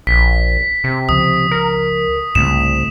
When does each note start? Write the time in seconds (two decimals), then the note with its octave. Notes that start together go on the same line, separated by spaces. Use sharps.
0.07 A#1 B6
0.84 C3
1.09 C#2 C#3 F3 D#6
1.51 A#4
2.35 C2 G#2 C#3 A3 E7